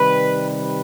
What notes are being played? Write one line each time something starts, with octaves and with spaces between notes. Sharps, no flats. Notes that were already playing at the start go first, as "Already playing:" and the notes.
Already playing: C3 D#3 G3 B4
B4